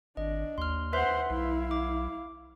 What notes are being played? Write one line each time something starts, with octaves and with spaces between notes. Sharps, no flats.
G#1 D4 D#5
D#2 C6 F6
B4 C5 E5 F#5 C6
B1 E4 F5
D6